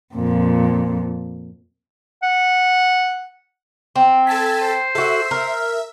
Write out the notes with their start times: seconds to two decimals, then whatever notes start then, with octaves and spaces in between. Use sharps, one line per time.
0.15 F2 A#2
2.23 F#5
3.96 C4
4.27 A4 G#5 A5 B6
4.61 C5
4.95 F#4 A4 E5
5.31 A#4